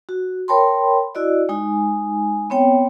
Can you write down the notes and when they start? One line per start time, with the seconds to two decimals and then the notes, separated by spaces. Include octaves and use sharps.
0.09 F#4
0.48 A#4 C#5 G5 A5 B5 C6
1.15 E4 F#4 D5 D#5
1.49 G#3 D#4 G#5
2.50 B3 C4 C#5 G5